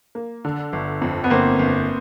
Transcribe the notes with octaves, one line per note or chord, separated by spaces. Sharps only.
A#3
D3
G1
F2
B3
G1 A#3 C4
G1